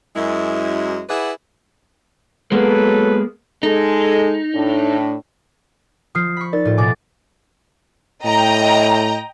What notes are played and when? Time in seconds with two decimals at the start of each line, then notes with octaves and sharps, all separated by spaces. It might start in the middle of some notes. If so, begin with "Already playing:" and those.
0.16 F#2 G#3 E4
1.09 E4 G#4 B4 D5 E5 F#5
2.52 F#3 G#3 A#3 B3 A4 B4
3.63 G#3 D#4 A4
4.55 A2 D4
6.15 F3 D#6 F6 C7
6.37 B5 C#6
6.53 D#4 A#4 D5 A6
6.65 A2 F4
6.77 B2 G#5 D6 A6
8.25 A2 D#5 G5 A#5